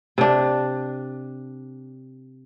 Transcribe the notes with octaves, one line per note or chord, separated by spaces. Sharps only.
C3 D4